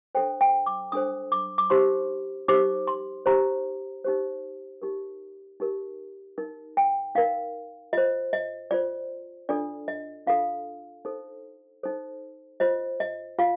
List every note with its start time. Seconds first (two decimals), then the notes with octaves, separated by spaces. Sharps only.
0.15 D4 A4 C5 G5
0.41 G5
0.66 D6
0.92 D4 A4 C5 D#6
1.32 D6
1.58 D6
1.70 D#4 G4 C5 C6
2.48 D#4 G4 C5 D6
2.88 C6
3.26 D#4 G4 C5 A#5
4.04 D#4 G4 C5
4.82 D#4 G4 A#4
5.60 D#4 G4 A#4
6.38 D#4 A#4
6.77 G5
7.15 D#4 A#4 F5
7.93 F4 C5 D#5
8.33 D#5
8.71 F4 C5 D5
9.49 D4 F4 A4 D5
9.88 D#5
10.27 D4 F4 A4 F5
11.05 D#4 A4 C5
11.83 D#4 A4 C5
12.60 F4 C5 D#5
13.00 D#5
13.39 F4 F5